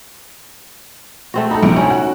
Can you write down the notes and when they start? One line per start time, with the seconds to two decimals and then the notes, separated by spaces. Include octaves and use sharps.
1.34 A3 C4 F#4
1.51 D#4 A4 B5
1.63 A#1 C3
1.76 D2 C#4
1.90 F#4